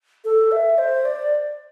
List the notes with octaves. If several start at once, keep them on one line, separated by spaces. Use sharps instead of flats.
A4
E5
C5
D5